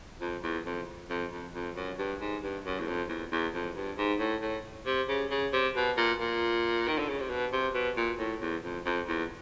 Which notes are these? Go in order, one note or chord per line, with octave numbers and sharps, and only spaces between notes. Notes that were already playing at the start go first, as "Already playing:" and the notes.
F2
E2
F2
F2
F2
F2
F#2
G2
G#2
G2
F#2
E2
F2
E2
E2
F2
G2
G#2
A2
A2
C3
C#3
C#3
C3
B2
A#2
A#2
D#3
D3
C#3
C3
B2
C3
B2
A#2
A2
E2
F2
F2
E2